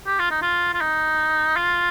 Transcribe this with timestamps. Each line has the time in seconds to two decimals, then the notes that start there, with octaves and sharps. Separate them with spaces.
0.07 G4
0.19 F4
0.31 D#4
0.42 F4
0.74 F4
0.81 D#4
1.56 F4